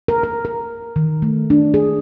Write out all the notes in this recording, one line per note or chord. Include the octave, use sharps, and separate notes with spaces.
A#4
A#4
A#4
D#3
A3
D4
G#4